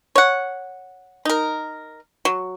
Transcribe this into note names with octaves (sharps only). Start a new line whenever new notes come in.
C#5 F#5
D#4 A#4
F#3